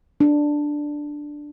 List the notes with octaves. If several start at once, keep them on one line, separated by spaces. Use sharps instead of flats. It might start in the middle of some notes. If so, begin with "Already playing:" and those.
D4